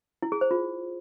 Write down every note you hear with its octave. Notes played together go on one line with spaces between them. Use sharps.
E4
G#4
C5
F4